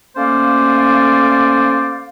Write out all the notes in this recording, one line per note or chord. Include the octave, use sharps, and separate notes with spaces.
A3 A#3 C#4 C5 D5 F5